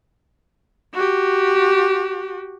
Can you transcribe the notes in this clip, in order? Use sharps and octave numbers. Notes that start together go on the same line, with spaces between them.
F#4 G4